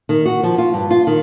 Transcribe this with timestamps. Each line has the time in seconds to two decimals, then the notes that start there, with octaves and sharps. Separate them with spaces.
0.09 D#3
0.26 F#4
0.43 F3
0.58 F4
0.74 G2
0.91 F4
1.07 D#3